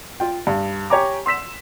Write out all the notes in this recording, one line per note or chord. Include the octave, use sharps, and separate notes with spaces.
F4 G5
G2
G4 C#5 G#5 A#5 D6
C6 E6 B6 E7